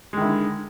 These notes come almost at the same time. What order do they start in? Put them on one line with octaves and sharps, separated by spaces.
G#3 D#3 E4 D3